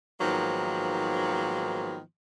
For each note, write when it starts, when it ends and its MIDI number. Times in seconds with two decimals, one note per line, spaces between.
0.21 1.99 44
0.21 1.99 51
0.21 1.99 53
0.21 1.99 54
0.21 1.99 58
0.21 1.99 59